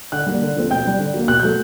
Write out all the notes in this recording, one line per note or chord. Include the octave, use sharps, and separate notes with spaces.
D3 F#5 F#6
G3 A#3
D3
F3 A3 C4
B2 G5 G6
G3 C4
D3
F#3 A#3
B2 F#6
F#3 A3 G6